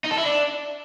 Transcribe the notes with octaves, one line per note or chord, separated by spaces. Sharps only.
D#4
A4
E4
D4